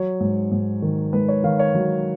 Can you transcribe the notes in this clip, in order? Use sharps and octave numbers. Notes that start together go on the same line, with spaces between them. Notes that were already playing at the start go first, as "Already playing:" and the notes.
Already playing: F#3 C#5
G#2
G#2
D#3
G#2 B4
C#5
D#3 F5
C#5
F#3